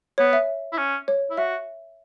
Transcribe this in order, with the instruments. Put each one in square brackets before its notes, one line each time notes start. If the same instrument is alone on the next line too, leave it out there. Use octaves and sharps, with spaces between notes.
[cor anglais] B3 [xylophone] C#5
[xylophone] E5
[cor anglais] E4
C#4
[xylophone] C#5
[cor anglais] E4
[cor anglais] F#4 [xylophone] E5